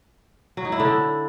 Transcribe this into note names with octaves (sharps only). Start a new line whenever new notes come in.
F#3
D#4
E4
D3